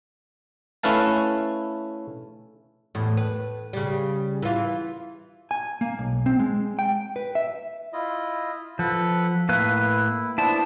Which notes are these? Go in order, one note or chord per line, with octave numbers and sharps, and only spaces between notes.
A3 C#4 E4 B4 F5 A5
E2 A2
B4
C#3 G3
E3 F4
G#5
A#3
B1
C4
G#3
G5
B4
E5
E4 F4 D#5
F3 A4 B4 F#5
A2 A#3 B4 E5 F5
E4
B3 D4 E4 C5 A5